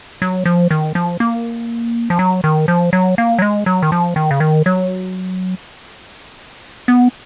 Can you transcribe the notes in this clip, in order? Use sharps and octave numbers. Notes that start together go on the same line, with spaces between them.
F#3
F3
D#3
F3
A#3
F3
F#3
D#3
F3
F#3
A#3
F#3
G#3
F#3
D#3
F3
D#3
C#3
D#3
F#3
B3